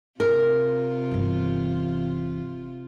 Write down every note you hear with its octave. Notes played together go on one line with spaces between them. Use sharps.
C3 F4 A#4
G1 E3